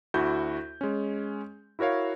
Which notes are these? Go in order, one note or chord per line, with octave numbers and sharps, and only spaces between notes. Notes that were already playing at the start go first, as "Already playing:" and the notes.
D2 E4 F#4 G6
G#3 C#4
E4 F#4 A#4 C#5 F5